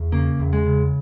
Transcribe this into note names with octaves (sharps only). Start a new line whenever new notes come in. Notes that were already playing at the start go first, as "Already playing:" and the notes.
Already playing: E2
C#3 A#3
E2
G#3
C#3